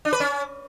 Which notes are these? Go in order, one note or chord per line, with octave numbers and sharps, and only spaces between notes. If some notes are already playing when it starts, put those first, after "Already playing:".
D4
B4
C#4